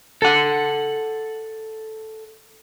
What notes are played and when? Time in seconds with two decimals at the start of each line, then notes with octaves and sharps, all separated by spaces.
0.22 A4 F#5